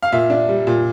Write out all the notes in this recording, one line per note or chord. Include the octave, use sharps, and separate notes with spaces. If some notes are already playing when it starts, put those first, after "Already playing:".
F5
A#2 E5
D4
G3
A#2